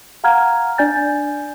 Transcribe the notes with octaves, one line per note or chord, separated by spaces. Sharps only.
F5 F#5 A#5 F6 G#6
D4 D5 G#5 G6 A6